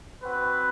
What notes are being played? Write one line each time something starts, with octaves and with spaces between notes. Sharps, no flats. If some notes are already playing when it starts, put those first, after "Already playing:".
C4 F#4 B4